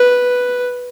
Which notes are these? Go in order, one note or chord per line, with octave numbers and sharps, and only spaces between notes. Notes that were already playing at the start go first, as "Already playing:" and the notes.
Already playing: B4